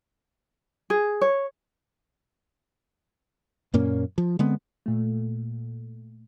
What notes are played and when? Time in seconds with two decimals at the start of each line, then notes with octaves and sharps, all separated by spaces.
0.90 G#4
1.21 C#5
3.74 F#2 A#2 A#3 C#4
4.18 F3
4.39 D3 G#3 B3 C4
4.86 A#2 A3